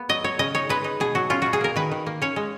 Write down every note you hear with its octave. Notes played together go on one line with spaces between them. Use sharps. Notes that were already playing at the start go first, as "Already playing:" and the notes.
Already playing: A#3 B3
F#3 D#5
F#3 C#5
C#3 D#5
D#4 C#5
G#3 B4
D#4
B2 G#4
F#3 F#4
C#4 F4
B2 F#4
G#4
A#3 A#4
D#3 B4
D#3
A#3
C#4 C#5
G#3